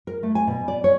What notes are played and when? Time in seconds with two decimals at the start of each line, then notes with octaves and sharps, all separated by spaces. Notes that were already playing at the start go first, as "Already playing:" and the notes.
0.07 A#4
0.23 A3
0.35 G#5
0.47 B2
0.68 D5
0.84 C#5